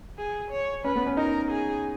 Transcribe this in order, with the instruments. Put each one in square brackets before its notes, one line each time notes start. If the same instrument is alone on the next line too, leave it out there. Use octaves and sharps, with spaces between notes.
[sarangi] G#4
C#5
[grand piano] C#4 [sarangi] B4
[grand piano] B3
C#4
[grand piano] D#4 [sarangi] A#4
[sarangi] G#4